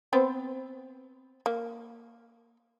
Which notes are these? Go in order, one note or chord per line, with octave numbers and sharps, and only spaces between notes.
B3 C4 C5
A#3